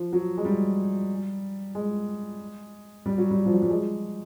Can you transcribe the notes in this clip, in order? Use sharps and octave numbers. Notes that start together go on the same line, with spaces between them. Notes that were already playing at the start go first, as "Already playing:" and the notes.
Already playing: F3
F#3
G#3
G3
G#3
G3
F#3
G3
F3
F#3
G3
G#3